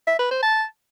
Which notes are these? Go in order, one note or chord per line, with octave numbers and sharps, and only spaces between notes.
E5
B4
C5
A5